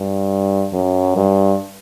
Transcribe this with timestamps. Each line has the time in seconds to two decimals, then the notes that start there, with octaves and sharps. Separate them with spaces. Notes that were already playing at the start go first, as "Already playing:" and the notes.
Already playing: G2
0.73 F#2
1.16 G2